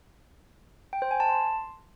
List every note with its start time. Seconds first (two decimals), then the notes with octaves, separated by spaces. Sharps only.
0.93 G5
1.02 C5
1.11 G#5
1.20 A5
1.29 C6